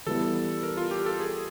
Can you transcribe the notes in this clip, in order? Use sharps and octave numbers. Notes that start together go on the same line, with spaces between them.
E3 G3 B3 E4 A4
A#4
F4
G4
A4
G#4